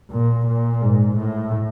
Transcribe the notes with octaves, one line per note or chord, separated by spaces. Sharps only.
A#2
A#2
G#2
A2